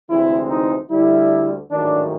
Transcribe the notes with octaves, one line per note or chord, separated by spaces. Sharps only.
D2 C3 E3 G#3 C4 E4
D#4
D2 D3 G3 E4
A1 G#2 D#3 F#3 D4